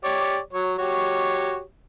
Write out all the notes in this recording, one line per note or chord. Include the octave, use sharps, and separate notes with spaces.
G4 C#5 D5
F#3 C#5
F#4 G4 C#5